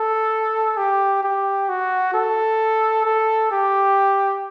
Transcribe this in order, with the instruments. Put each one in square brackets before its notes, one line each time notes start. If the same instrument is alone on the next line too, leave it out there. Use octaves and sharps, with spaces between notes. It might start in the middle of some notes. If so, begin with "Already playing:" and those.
Already playing: [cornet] A4
G4
G4
F#4
A4
A4
G4